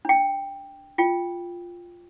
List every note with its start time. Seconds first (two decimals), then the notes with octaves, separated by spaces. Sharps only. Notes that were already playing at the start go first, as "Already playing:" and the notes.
0.05 D4 G5
0.98 F4 G5